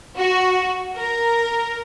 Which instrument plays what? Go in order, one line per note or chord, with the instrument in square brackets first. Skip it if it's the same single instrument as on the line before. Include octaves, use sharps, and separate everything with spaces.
[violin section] F#4
A#4